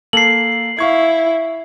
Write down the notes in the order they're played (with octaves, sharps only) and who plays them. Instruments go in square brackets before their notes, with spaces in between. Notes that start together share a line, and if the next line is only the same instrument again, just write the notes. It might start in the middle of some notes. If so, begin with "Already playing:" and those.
[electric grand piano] A#3 A4 [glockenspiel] C7 F#7
[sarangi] E4 [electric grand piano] F5 C#6 G#6